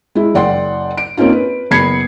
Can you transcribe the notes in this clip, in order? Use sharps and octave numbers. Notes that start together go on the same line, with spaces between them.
G#3 E4
F#1 D5 F#5 G5 C6
D7
A#3 C4 C#4 D#4 F4
B4
F#1 B3 B5 G#6 C7 C#7